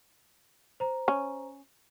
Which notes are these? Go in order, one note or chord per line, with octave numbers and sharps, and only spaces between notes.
C5 A#5
C#4